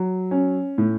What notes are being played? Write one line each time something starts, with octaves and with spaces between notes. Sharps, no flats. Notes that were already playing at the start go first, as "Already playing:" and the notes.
Already playing: F#3
C#4
A2